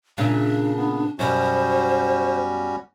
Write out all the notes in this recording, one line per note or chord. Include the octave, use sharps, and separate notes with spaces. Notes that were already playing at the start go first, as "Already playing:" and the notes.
A#2 C#3 D4 E5
B3
F#2 B2 G3 C#4 F#4 C5